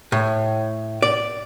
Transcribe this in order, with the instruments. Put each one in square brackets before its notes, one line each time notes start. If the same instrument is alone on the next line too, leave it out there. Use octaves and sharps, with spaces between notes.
[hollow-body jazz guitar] A2
D5